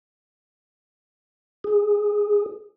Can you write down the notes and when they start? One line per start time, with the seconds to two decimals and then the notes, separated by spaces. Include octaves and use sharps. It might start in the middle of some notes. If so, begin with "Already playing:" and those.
1.64 G#4